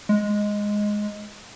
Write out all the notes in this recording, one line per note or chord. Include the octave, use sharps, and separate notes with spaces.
G#3